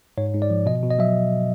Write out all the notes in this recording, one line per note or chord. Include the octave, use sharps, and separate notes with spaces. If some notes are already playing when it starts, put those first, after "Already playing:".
G#2 C#5
G#2
D5
F3
B2 D#5
B2
D#5
F#3 E5